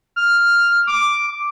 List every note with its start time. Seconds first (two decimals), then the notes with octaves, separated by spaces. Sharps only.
0.16 F6
0.87 D6